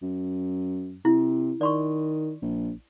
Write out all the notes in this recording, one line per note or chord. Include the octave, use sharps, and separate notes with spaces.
F#2
C3 E4
D#3 D5 C6 C#6
A#1